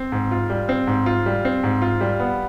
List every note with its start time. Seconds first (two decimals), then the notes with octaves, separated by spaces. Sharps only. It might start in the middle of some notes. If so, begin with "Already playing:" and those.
Already playing: C4
0.12 G#2
0.31 F4
0.50 G3
0.69 C4
0.87 G#2
1.06 F4
1.26 G3
1.45 C4
1.64 G#2
1.82 F4
2.01 G3
2.20 B3